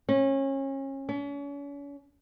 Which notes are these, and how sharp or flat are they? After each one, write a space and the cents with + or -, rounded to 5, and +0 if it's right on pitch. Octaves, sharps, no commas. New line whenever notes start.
C#4 -30
C#4 +40